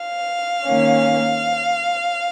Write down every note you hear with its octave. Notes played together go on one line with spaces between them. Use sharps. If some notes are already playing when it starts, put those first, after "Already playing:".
Already playing: F5
D#3 A#3 C#4